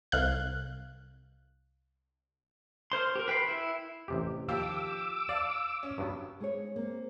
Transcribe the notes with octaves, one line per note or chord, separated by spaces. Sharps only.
C2 F5 F#6
A#4 C5 C6
G4 A#4
B4 G5 B5 C6
E4
A1 C3 G4
D#2 F3 G4 F5 D6 E6
D5 F5 A5
C#4
G2 F#3 B3
G#3 G#4 C#5
A#3 C4